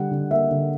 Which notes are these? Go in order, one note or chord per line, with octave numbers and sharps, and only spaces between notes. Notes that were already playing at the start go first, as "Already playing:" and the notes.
Already playing: D3 G3 F#5
D3
A#3 E5
D3